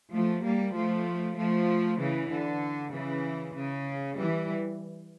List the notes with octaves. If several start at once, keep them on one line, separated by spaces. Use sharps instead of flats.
F3 A3
G3 A#3
F3 A3
F3 A3
C#3 E3
D3
C#3 E3
C#3
E3 G3